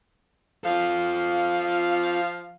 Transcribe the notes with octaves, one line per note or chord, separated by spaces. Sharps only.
F3 F4 A4 F5